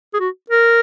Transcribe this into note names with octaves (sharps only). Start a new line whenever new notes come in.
G#4
F#4
A#4